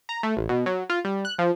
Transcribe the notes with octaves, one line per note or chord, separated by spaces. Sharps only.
A#5
A3
A1
B2
F#3
F4
G3
F#6
F3